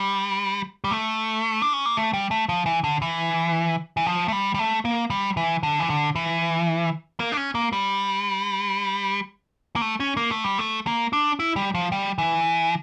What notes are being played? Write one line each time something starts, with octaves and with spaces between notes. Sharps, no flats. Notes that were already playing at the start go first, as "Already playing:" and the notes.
Already playing: G3
G3
A3
D4
C#4
A#3
A3
G3
A3
F3
E3
D3
E3
E3
F3
A3
G3
G3
A3
A#3
G3
E3
D3
E3
D3
E3
A#3
D4
C#4
A#3
G3
A#3
A3
C#4
A#3
A3
G3
A3
A#3
D4
E4
G3
F3
G3
E3